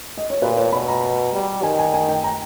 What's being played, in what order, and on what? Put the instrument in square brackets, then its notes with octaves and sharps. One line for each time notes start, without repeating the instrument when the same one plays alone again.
[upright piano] D#5
C#5
[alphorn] A#2 [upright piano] B4
[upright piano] C#5
[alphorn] B2 [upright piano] B5
[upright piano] A#5
[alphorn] G3
[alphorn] D#3 [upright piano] G#5
[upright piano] G#5
G#5
G5
A#5